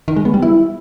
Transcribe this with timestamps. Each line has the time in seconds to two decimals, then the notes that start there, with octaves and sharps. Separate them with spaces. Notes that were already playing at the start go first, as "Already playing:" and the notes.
0.08 D#3
0.16 G#3
0.25 B3
0.34 G3
0.42 E4